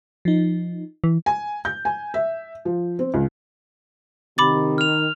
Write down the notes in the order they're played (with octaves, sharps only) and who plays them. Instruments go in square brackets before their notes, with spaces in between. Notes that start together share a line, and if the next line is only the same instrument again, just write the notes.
[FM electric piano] F3 D#4
[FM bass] E3
[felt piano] G#5
G6
G#5
E5
F3
C4
C#2
[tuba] C3 [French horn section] D#3 [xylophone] B5 D6 A6
[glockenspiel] F6 F7